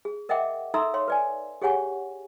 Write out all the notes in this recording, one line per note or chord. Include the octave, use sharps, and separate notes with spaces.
G#4
A#4 D#5 E5 F#5 G5 D6
D#4 A4 E5 A#5 C6 E6
C#5 F5 C6
B4 D5 G#5
G4 G#4 C#5 F#5 G#5 C#6